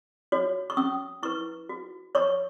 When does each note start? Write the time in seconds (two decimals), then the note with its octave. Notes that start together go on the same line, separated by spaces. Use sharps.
0.32 F#4 C#5
0.70 C#6
0.77 C#4 D#6
1.23 E4 B4 C#6
1.69 F#4
2.15 C#5 C#6